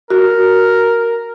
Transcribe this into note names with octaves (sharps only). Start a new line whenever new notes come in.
F#4 A#4